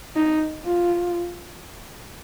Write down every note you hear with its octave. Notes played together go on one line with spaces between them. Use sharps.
D#4
F4